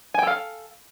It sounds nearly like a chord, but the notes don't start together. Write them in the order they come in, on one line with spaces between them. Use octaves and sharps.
G#5 G5 A4 F5